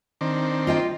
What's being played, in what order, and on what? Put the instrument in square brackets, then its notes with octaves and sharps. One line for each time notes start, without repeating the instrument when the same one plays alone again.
[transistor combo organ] D#3 C4 D4
[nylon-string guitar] F4 D#5 G5